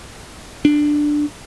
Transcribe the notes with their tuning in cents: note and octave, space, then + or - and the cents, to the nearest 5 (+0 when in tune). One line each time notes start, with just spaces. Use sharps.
D4 +10